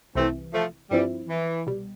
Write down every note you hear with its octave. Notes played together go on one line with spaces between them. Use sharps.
C2 C3 E3 A3 C4
F3 A3
G2 E3 F3 G3 C4 E4
E3
C2 B2 G3